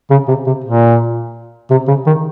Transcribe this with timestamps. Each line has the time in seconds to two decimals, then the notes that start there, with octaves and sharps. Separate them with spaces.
0.11 C#3
0.28 C3
0.46 C3
0.64 A#2
1.71 C3
1.88 C#3
2.07 D#3